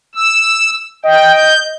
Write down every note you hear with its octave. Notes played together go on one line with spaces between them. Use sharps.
E6
D#5 G5
G6